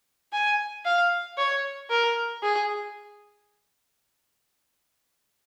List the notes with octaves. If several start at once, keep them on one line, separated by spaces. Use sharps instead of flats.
G#5
F5
C#5
A#4
G#4